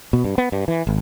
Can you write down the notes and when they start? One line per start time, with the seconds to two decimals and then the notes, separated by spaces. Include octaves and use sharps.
0.13 B2
0.24 G2
0.38 B3
0.52 G2
0.68 E3
0.87 G#1